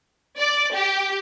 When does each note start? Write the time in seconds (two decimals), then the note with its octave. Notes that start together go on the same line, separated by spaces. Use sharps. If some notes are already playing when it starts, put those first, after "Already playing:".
0.39 D5
0.73 G4